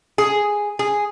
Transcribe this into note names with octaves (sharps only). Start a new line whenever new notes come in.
G#4
G#4